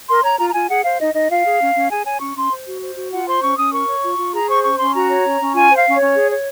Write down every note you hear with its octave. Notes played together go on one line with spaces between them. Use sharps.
A#4 C6
C#5 A#5
F4 A#5
A#5
F4 G#5
G#4 F#5
C5 F5
D#4 D#5
D#4 D#5
F4 F5
G#4
C#4
C#4
G#4 G#5
C#5 G#5
C#4 C#6
C#4 C6
C5
F#4
C5
F#4
F4 F#5
C5 C6
C#4 C#6
C#4 D#6
A#4 C#6
C#5
F4
F4
G#4 A#5
C5 C#6
C#4 C#6
C#4 C6
F#4 A#5
C#5
C#4
C#4
F4 G#5
C5
F5
C#4
C#4 C#5
G#4
C#5